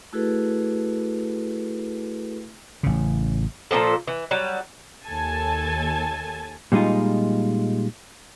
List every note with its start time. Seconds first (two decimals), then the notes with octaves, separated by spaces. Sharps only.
0.13 A3 E4 F#4 G#4 A4 B4
2.83 A1 C#3
3.71 A#2 D3 F3 A4
4.07 E3
4.31 F#3 G3
5.06 D#2 A4 G#5 A5 G#6 A6
6.72 A#2 G3 G#3 D#4 F4